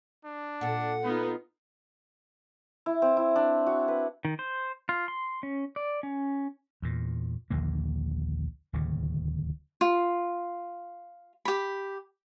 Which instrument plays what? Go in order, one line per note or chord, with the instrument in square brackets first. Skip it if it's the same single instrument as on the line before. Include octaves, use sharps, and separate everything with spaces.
[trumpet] D4
[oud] A#2 A4 [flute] F#5
[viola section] B3 D#4 F4 [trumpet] B4
[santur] E4
C4
E4
D4
F#4
B4
[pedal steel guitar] D#3
C5
F4
C6
C#4
D5
C#4
[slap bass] E2 A#2
A#1 D#2 D3 A#3
D1 D#2 C#3
[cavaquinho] F4
G4 B5